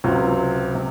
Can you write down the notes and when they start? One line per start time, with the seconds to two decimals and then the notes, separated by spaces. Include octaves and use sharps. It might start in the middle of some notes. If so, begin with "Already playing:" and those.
0.04 C#2 C3 F#3 C4 F4
0.75 C3